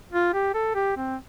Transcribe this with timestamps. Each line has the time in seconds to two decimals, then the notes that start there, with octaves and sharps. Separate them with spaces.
0.12 F4
0.33 G4
0.54 A4
0.75 G4
0.97 C4